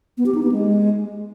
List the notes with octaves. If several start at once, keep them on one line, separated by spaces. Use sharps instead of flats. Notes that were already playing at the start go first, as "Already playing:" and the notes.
B3
G4
D#4
B3
G#3